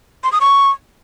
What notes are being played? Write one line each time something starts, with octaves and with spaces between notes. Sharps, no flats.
C6
D#6
C#6